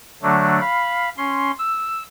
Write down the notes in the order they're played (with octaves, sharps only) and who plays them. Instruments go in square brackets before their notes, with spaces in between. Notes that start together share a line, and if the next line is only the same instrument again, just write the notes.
[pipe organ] D3 F#3 A3 D4
F5 B5
C#4 C6
E6